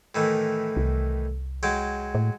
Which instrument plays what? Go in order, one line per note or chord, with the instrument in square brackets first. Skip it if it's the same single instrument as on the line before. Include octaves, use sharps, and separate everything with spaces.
[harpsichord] A2 D#3 E3
[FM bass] C2
[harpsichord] F#3 G#3 G5
[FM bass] A2